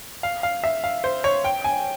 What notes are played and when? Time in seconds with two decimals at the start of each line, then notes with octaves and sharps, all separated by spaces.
0.23 F5
0.43 F5
0.64 E5
0.84 F5
1.04 C5
1.24 C#5
1.44 G5
1.64 G#5